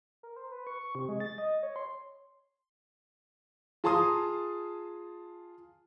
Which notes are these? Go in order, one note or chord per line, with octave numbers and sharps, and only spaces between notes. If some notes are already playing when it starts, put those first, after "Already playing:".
A#4
C5
B4
C#6
C#6
C3
G#3
A6
D#5
C#5
C6
F4 G#4 A5 A#5 C6 D#6